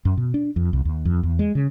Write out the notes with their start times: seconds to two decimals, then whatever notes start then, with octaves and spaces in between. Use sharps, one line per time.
0.05 F#2
0.17 B2
0.34 D4
0.56 F2
0.73 C2
0.85 D#2
1.05 F2
1.23 E2
1.39 G#3
1.55 C#3